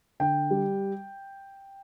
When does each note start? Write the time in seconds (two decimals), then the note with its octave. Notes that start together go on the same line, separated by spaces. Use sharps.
0.20 D3 G5
0.51 G3